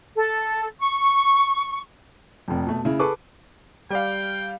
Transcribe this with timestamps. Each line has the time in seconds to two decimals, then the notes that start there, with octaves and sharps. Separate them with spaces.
0.16 A4
0.80 C#6
2.48 F1 F2
2.67 B2 A3
2.85 C#3 E4
2.99 G#4 A4 B4 C#6 D6
3.90 G3 D5 F5 G5